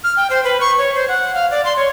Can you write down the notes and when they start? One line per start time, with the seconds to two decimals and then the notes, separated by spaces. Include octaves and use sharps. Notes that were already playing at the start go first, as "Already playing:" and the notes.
0.04 F6
0.17 G5
0.30 C5
0.44 B4
0.61 C#6
0.78 C#5
0.95 C5
1.08 F#5
1.34 F5
1.51 D5
1.65 C6
1.76 C#5